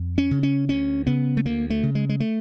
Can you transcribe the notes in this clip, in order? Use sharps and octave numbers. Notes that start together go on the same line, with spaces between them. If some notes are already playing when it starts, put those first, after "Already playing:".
Already playing: F2
C#4
C#3
C#4
D2 C#4
C#3 B3
A3
D2 A#3
A3
C#3
G#3
G#3
A3